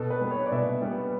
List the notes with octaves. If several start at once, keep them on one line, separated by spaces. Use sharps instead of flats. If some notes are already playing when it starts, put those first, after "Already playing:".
Already playing: B2 A4
B4
G3 B3
C#5
D5
B2 E5
G3 B3